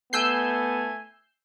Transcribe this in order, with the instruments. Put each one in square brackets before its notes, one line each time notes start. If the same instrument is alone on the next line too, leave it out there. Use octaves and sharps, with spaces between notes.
[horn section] A3 E4 G#5 [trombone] B3 [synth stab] E6 G6 C7